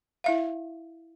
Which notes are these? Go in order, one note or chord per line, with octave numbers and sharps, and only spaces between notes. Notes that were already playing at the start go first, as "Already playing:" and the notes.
E4 E5 F5